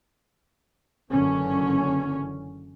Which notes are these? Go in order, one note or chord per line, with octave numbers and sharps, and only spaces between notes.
F#1 F#2 D3 E3 C#4